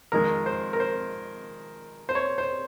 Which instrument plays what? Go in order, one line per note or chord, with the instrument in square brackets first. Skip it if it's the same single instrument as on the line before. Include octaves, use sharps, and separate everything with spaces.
[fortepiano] F2 D#3 G#3 A#4
C5
A#4
C5
C5
C#5
C5